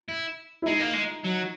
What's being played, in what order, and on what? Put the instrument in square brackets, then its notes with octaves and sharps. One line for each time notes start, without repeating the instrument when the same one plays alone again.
[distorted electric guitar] E4
[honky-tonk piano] E4
[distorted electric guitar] G#3 [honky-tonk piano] D#4
[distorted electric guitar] A#3
G#3
F#3